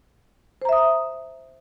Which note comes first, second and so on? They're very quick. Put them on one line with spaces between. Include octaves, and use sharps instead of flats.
C5 A#5 E5 D#6